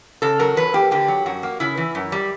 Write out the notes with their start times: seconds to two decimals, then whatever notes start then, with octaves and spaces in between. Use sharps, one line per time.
0.22 C#3 A4
0.39 F#3 A#4
0.56 E2 B4
0.73 A#3 G4
0.91 D3 G4
1.08 F#3
1.26 F#2 F#4
1.43 A#3
1.60 C#3 E4
1.77 E3
1.95 F#2
2.12 G3